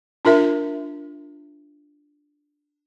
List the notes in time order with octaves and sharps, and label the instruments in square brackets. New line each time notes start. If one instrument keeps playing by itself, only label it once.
[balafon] D4 F4 A#4 E5